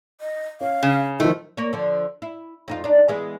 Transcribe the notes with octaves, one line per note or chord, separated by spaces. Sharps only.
D#5
C#4 F5
C#3
D#3 F3 A3 F4
A#3 C#5
D3 F3
E4
F2 D#4 F4
D4 D#4
E3 G#3 B3